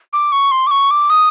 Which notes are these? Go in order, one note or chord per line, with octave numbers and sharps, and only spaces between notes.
D6
C#6
C6
D6
C#6
D6
D#6